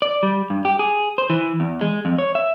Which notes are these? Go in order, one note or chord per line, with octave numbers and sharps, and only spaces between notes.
D5
G3
G2
G4
G#4
C5
E3
E2
G#3
F2
C#5
E5